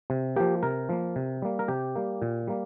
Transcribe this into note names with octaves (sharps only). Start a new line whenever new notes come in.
C3
F3 A#3 G4
C3 A#4
F3 A#3
C3
G3 A#3
A#4
C3 G4
G3 A#3
A#2
G3 A#3